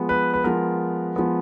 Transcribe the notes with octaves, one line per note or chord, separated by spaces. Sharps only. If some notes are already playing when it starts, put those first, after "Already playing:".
Already playing: F3 G#3 B3
B4
B4
F3 G#3 B3 A#4
F3 G#3 B3